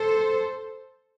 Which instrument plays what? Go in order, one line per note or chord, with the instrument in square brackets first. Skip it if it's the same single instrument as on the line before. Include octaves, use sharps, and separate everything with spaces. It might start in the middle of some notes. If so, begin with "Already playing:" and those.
Already playing: [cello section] A4 C5